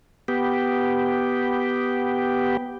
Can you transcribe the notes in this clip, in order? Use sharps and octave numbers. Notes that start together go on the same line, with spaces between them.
B3 G4